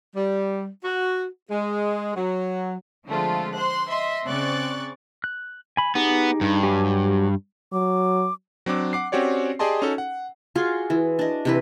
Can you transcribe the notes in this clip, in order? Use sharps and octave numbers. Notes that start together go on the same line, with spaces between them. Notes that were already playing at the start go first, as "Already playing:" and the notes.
G3
F#4
G#3
F#3
D3 F3 G#3 A3 C4 F4
C5 C6 F#6
D#5 E5 C6
C#3 C4 D5 C#6 F#6 A6
F#6
G#5 B5
B3 D#4 G4 G#4
G2
F#3 G4 G#5
F#3 D6
F#3 C4 D4 D6
F#5 D6 C7
C4 C#4 F#4 G4 C#5 D5
G4 G#4 D5 D#5 A5 C6
C#4 D#4 F#4 A4
F#5
F4 F#4 G#4 C6
E3
D4 D#5
C3 E3 B4